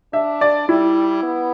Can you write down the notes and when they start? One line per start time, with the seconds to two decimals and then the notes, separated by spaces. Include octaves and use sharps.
0.13 D4 E5
0.41 D5
0.68 G3 E4
1.23 B3